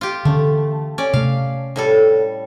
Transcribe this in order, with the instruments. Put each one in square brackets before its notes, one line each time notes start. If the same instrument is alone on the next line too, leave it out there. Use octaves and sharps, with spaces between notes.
[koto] F4 G4
[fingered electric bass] D3 E3 C#4 [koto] A3
[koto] C#4 D5
[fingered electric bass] C3 A3 [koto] F5
[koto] A2 G3 A4